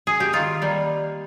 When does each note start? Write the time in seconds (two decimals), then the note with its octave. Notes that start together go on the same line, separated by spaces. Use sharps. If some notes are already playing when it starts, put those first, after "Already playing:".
0.07 G#4
0.20 G4
0.33 D#3 F4
0.62 G3 A#3